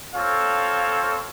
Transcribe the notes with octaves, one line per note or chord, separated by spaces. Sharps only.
C4 F4 A4 C#5 F5